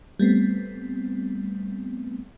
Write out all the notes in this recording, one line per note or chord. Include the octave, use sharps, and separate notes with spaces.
G3 A3 B3 C4